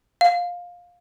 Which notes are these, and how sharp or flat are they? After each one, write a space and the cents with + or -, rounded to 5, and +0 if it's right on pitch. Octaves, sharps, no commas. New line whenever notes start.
F5 +15